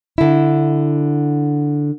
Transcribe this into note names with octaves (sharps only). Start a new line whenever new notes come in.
D3 E4